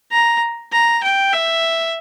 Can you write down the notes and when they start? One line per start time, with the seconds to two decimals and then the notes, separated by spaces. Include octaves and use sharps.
0.11 A#5
0.72 A#5
1.03 G5
1.33 E5